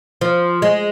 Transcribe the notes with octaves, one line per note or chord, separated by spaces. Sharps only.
F3
G#3